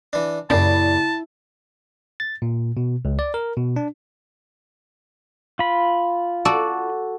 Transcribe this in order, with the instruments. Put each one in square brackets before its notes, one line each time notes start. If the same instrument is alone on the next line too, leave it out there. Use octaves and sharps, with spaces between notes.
[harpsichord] E3 D4
[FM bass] F#2 [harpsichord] A#2 C#3 G3 [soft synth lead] E4 [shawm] A5
[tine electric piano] A6
A#2
B2
C#2
D5
A#4
B2
D4
[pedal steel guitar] F4 B5
[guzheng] F#4 A4 D5